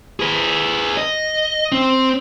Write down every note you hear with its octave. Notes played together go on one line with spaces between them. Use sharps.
G#4 B4
D#5
C4